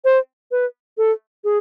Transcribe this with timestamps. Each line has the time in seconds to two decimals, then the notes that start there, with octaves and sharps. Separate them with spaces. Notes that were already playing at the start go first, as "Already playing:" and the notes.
0.05 C5
0.51 B4
0.98 A4
1.44 G#4